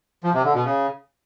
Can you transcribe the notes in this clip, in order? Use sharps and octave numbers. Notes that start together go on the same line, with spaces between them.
F3
C3
D3
B2
C#3